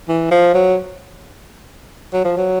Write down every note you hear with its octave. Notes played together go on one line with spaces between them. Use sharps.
E3
F3
F#3
F#3
F3
F#3